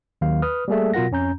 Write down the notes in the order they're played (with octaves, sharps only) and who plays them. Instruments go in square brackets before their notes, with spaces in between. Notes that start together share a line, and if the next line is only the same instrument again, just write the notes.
[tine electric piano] D#2 D#3 F#3 F5
B4 D#6 F6
G3 A3 A#3 G#4 A4 E5
B2 F#3 F4 A#4 F#5 A#6
F2 C#4 A#5 G6